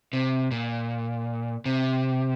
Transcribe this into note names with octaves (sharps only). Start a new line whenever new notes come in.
C3
A#2
C3